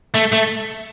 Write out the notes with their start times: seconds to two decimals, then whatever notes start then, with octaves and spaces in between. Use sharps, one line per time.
0.14 A3
0.32 A3